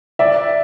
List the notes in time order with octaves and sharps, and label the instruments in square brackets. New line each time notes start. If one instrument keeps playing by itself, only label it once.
[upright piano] D5 E5